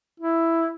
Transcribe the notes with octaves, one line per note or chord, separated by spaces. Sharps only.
E4